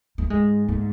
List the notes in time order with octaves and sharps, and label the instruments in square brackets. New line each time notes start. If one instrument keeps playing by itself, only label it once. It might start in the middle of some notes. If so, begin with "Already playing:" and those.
[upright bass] A3
[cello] G#2 [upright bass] G#3
[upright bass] A3